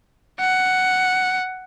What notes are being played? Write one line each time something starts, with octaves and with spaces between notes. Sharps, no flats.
F#5